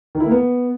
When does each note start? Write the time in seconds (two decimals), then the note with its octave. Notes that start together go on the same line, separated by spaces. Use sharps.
0.15 D#3
0.20 E4
0.26 A#3
0.31 B3